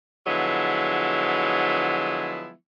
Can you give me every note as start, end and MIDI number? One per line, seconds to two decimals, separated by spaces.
0.27 2.52 50
0.27 2.52 53
0.27 2.52 54
0.27 2.52 56
0.27 2.52 59
0.27 2.52 64